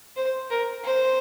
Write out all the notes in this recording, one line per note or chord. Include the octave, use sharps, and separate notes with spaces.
C5
A#4
C5